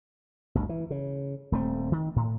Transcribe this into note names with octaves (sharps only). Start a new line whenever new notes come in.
G1 D2
E3
C#3
D#1 A3 C4
D#3
A2